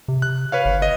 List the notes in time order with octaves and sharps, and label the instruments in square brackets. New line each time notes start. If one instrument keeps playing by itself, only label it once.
[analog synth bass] C3
[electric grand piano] F#6
B4 C#5 F5
[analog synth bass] G1
[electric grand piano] D#5